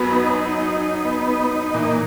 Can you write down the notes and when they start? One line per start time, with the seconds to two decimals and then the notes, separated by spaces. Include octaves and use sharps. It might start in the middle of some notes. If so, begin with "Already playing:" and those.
Already playing: F#2 F#3 B3
0.12 D#4
0.35 D#4
0.58 D#4
0.82 D#4
1.05 B3
1.28 D#4
1.51 D#4
1.74 A#2 E3